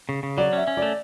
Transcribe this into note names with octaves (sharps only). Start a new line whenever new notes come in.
C#3
C#3
F#3 D5
C#4 E5
C#4
D5
A3